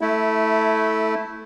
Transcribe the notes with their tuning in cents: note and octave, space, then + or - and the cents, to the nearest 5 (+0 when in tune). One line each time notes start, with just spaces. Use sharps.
A3 +0 E4 -15